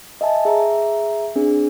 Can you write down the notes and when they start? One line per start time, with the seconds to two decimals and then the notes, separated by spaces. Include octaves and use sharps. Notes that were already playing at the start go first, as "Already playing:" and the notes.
0.21 D#5 E5 G#5 A5
0.45 G#4 E5 A#5
1.36 C4 D4 G#4